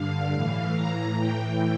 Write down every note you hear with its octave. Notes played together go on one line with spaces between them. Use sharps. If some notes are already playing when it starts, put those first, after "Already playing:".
Already playing: G2 D3 F5
A2 E3
A2 E3 A#5
A2 E3 G5